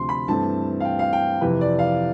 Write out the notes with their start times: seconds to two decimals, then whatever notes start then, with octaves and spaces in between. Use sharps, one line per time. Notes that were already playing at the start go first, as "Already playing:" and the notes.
Already playing: D2 C3 F3 C4 C6
0.09 B5
0.28 G2 E3 A3 C4 A5
0.80 F5
0.85 G5
0.99 F5
1.13 G5
1.41 F2 C3 E3 B4
1.61 D5
1.79 F5